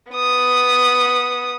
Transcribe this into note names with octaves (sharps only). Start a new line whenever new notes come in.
B3 D#6